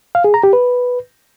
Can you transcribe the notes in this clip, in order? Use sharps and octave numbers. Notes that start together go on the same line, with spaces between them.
F5
G#4
A#5
G4
B4